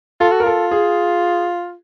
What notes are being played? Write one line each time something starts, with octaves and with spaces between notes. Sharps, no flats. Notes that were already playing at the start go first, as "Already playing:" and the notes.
F4 A4
F#4
A#4
F4 A4
G#4